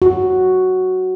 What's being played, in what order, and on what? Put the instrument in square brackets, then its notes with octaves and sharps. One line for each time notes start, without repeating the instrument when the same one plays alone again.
[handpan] F#4